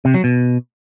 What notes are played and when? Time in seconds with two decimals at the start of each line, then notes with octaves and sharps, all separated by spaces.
0.05 C3
0.14 F#3
0.24 B2